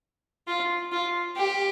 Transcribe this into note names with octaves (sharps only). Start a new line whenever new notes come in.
F4
F4
G4